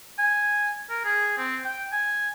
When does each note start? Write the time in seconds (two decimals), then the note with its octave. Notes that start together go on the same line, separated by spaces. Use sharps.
0.19 G#5
0.90 A#4
1.05 G#4
1.38 C4
1.64 G5
1.92 G#5